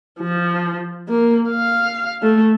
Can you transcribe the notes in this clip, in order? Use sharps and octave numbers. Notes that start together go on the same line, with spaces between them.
F3
A#3
F5
A3